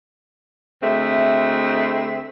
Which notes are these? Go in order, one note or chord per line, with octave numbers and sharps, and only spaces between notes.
D2 G#3 A3 C4 E5